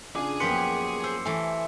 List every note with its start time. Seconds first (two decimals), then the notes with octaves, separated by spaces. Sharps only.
0.15 C#3 D4 F4 G#4 G#5 D6
0.40 F#2 F3 A#3 B3 G4 B4 C6 C#7
1.04 C5 E6
1.25 E3 A3 G#5